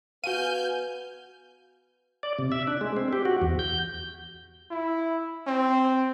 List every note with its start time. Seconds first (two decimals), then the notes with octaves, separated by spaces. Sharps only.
0.24 B3 F#4 F5 G#5 F6 G6 D#7
2.23 D5
2.39 C3
2.52 E5
2.67 D4
2.81 G#3
2.97 C4
3.13 G4
3.25 F#4
3.42 E2
3.59 G6
4.71 E4
5.47 C4